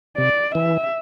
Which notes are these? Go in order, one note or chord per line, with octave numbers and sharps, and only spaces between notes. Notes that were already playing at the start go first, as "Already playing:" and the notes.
C3 D5
E3 E5